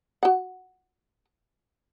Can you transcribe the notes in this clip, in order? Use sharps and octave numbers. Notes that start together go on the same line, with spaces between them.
F#4 F#5